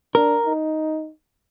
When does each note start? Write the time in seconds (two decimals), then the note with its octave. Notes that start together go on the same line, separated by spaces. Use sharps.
0.15 D4 A#4
0.46 D#4